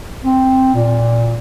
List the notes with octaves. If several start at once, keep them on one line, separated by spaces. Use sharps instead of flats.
C4
A#2